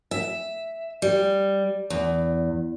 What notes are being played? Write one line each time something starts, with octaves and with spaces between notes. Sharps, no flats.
E5
G3
E2